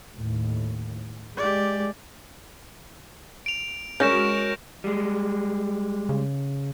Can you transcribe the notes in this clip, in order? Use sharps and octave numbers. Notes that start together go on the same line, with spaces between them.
D#2 A2
G#3 G4 D5
D7 F7
G#3 C#4 F#4 A#4 G6 A#6 E7
G3 G#3
C#3